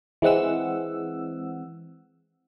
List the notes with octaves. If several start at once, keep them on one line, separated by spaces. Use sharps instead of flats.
E3 G#3 C4 F#5 E6